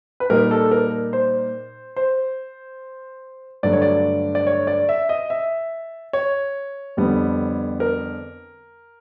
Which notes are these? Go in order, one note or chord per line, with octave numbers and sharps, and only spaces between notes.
B4
A#2 G3 A#3 D#4 A#4
A4
A#4
C5
C5
G2 D3 F#3 A3 D5
C#5
D5
D5
C#5
D5
E5
D#5
E5
C#5
F2 D3 G3 B3
A#4